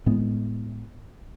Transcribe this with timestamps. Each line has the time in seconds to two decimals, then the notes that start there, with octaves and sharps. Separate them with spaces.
0.06 A2 G#3 B3